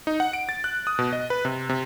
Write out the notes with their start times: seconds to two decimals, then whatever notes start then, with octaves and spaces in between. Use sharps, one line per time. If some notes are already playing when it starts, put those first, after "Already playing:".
0.07 D#4
0.20 F#5
0.33 D7
0.49 A6
0.64 F#6
0.87 D#6
0.99 B2
1.13 D#5
1.30 B4
1.45 C3
1.69 C3